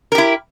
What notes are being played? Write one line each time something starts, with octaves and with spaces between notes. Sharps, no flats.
E4 G4 A#4